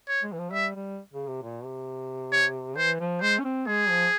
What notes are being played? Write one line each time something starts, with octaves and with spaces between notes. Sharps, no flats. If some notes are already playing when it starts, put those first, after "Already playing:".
C#5
G#3
E3
F3
G3 E5
G3
C#3
C3
A#2
C3
C#5
E3 C5
F3
G#3 C5
C#4
C4
G#3 G#4
F3